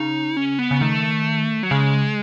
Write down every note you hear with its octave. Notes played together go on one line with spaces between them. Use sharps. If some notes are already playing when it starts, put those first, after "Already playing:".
Already playing: C#3 D#4
C#4
B3
C#3
D#3 A3
F#3
C#3 G#3